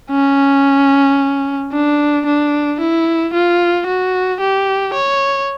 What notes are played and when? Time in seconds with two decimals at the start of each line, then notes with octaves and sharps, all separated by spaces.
0.11 C#4
1.72 D4
2.26 D4
2.80 E4
3.34 F4
3.87 F#4
4.40 G4
4.94 C#5